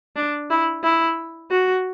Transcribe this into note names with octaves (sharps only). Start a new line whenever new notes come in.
D4
E4
E4
F#4